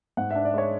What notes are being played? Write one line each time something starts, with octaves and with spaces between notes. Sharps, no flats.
G#2 F#5
D4 E5
D5
G#3 C#5